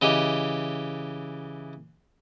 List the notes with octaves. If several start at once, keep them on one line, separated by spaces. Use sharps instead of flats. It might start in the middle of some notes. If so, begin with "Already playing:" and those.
C#3 E3 G4 D#5